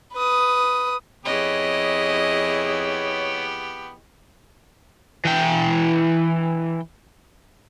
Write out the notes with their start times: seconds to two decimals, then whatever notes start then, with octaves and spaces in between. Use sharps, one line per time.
0.14 B4 D#6
1.26 F2 B3 E4 G4 G#4 C#5 D#5
5.25 E3 G5